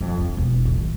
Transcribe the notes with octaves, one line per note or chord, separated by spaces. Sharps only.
F2
D3
E1
A1
D#3